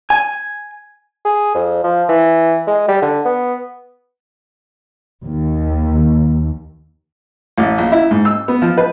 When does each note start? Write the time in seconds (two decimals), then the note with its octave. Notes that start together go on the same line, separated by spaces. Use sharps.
0.10 G#5
1.25 G#4
1.55 F2
1.84 F3
2.09 E3
2.67 G#3
2.88 G3
3.02 D3
3.25 B3
5.24 D#2
7.58 A1
7.78 A#1
7.92 E4
8.11 G#2
8.25 E6
8.48 B3
8.62 F3
8.78 B4